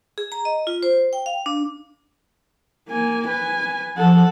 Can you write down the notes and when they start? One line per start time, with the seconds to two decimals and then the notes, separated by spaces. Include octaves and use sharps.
0.18 G#4
0.32 A#5
0.45 D#5
0.67 F4
0.83 C5
1.13 G5
1.26 F5
1.46 D4
2.89 A#3 G#5
3.28 B4 G#5
3.98 F3 A4 F#5